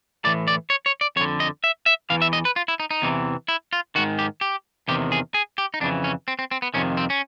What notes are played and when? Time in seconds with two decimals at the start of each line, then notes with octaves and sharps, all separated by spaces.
0.24 A2 E3 D5
0.48 D5
0.70 C#5
0.86 C#5
1.01 D5
1.16 F2 C#5
1.21 D3
1.40 D#5
1.64 E5
1.86 E5
2.10 E2 C3 E3 F5
2.22 E5
2.33 D#5
2.45 B4
2.56 F4
2.68 E4
2.80 D#4
2.91 D#4
3.02 E2 C3 E3
3.48 E4
3.73 F4
3.95 G#2 D#3 F#4
4.19 G4
4.41 G4
4.88 E2 C3 D#3 G4
5.12 G#4
5.34 G#4
5.58 G4
5.74 D#4
5.81 F2 C#3 E3 D4
6.04 C#4
6.28 C4
6.39 C4
6.51 C4
6.62 B3
6.74 F2 C3 D#3 C#4
6.97 C4
7.10 C#4